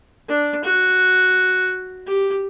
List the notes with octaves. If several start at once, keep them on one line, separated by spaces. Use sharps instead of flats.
D4
F#4
G4